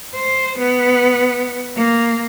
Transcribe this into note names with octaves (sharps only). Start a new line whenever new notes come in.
C5
B3
A#3